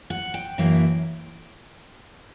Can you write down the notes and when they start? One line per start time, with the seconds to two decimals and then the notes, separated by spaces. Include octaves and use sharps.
0.10 F#5
0.34 G5
0.58 F#2 E3 A#3 E4